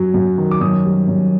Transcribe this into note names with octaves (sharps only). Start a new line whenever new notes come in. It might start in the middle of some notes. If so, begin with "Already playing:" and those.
Already playing: F#2 F#3
F#2
D#3
D6
F#2 D#6
G3
F#2